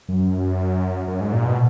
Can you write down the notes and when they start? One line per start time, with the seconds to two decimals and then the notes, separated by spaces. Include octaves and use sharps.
0.08 F#2
1.08 F#2
1.20 G#2
1.33 A#2
1.45 B2